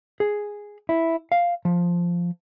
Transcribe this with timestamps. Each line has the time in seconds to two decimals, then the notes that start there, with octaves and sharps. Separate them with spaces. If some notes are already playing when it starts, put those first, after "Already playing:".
0.20 G#4
0.89 E4
1.32 F5
1.65 F3